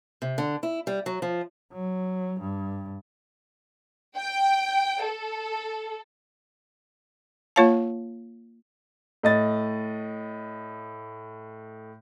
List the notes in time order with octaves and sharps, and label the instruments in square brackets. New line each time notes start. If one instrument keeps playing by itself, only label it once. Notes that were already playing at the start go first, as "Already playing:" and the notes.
[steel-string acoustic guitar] C3
D3
E4
G3
F#3
F3
[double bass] F#3
G2
[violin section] G5
A4
[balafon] A#3 F4 C#5 F5 A5
[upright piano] A2 D#5 A6